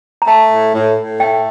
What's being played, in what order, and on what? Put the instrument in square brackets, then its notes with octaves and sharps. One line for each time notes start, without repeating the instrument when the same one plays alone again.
[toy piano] A#5
[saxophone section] A3 [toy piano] A5
[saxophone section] A2
A2
A2
[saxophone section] A3 [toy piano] G5